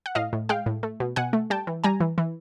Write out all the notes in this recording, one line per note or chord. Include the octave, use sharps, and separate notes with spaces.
F#5
A2 D#5 F5
A2
G#3 F5 G5
A2
A3
B2
B2 F#5 G#5
A3
G3 G5 A5
E3
G3 G#5 A#5
E3
E3